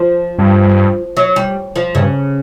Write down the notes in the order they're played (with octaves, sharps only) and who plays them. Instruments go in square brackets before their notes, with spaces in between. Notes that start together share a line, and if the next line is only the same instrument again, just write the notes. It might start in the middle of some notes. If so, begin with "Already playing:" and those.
Already playing: [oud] F3
[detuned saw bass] G2
[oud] F#3
G3
F3
[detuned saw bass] G2 [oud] C#3